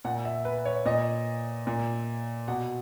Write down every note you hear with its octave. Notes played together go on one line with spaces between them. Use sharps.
A#2 F#5
E5
B4
C#5
A#2 D#5
A#2
B2 F#5